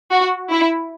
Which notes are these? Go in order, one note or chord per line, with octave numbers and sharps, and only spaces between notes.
F#4
E4